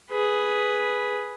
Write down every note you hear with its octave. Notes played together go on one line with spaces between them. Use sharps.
G#4 B4